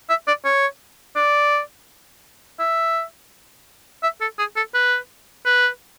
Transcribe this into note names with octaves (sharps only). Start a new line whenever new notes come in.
E5
D5
C#5
D5
E5
E5
A4
G#4
A4
B4
B4